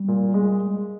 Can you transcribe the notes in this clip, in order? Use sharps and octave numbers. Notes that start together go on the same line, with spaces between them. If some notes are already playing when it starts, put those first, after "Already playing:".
Already playing: G3
A#2
G#3